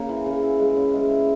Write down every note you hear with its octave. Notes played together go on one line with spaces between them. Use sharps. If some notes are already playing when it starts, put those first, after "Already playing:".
Already playing: C#3 A#3
E3
C#3
E4
G#3
C#4
G#3
E4